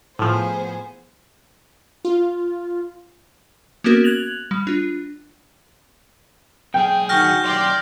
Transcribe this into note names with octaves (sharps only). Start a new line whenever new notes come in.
A2 F3 B3 G#4 C5
F4
A#3 B3 C#4 F#4 A#4
F#6 G#6 A6 F7 F#7
G3
D4 F4
B1 G#4 G5
D#3 F#4 F6 G6 A#6
B1 G4 D5 C6